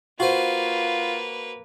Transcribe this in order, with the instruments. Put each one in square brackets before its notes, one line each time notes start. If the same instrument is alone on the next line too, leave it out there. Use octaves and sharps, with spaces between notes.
[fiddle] A#3 B4 [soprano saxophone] F4 [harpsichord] F#4 C5